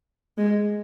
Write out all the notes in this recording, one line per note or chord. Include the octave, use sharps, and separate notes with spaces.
G#3